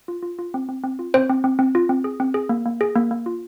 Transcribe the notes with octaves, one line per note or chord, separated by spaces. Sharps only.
F4
F4
F4
C4
C4
C4
F4
C4 C5
C4
C4
C4
F4
C4
G#4
C4
G#4
A#3
A#3
G#4
A#3
A#3
F4